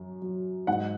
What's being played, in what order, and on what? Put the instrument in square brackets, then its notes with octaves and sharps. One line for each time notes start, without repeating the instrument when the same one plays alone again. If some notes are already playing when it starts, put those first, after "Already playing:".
Already playing: [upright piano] F#2 F#3
F#3
G#2 F#5